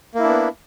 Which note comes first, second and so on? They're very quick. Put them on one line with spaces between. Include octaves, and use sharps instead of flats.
A#3 E4 D4 B3